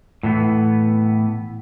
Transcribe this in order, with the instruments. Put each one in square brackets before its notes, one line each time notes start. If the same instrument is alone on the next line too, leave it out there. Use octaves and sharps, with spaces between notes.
[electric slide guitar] A2 E3 B3